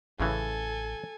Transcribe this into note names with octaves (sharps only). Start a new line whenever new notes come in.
A1 A2 C#3 E3 A4 G#5